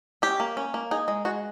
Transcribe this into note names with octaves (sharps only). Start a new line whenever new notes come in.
C#4 G4
A#3
C#4
A#3
D#4 G#4
G#3
G#3 F#4